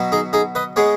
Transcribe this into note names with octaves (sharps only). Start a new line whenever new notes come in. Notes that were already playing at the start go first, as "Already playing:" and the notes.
Already playing: B2 F#3 B3
D#4 G#4
D#4 G#4
B4 D#5
G#3 B3 G#4 C#5